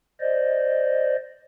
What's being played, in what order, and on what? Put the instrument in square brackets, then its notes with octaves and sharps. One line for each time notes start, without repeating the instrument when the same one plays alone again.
[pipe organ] C5 D5 D#5